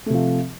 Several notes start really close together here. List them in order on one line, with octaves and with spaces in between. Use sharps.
A3 C3 F3